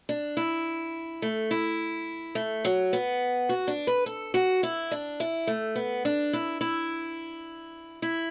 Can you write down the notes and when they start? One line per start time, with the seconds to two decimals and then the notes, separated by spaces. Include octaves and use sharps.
0.09 D4
0.37 E4
1.22 A3
1.51 E4
2.35 A3
2.65 F#3
2.93 B3
3.49 F#4
3.68 D4
3.87 B4
4.06 A4
4.34 F#4
4.63 E4
4.91 D4
5.20 E4
5.47 A3
5.75 B3
6.05 D4
6.33 E4
6.61 E4
8.02 E4